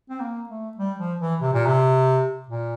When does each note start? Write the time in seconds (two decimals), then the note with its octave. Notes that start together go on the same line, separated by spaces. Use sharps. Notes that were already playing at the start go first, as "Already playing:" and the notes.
0.10 C4
0.20 A#3
0.49 A3
0.77 G3
0.98 F3
1.20 E3
1.41 C3
1.53 A#2
1.66 C3
2.48 A#2